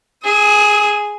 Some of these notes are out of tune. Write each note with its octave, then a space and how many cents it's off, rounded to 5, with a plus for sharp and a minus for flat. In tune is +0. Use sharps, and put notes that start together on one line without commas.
G#4 +0 D#6 +45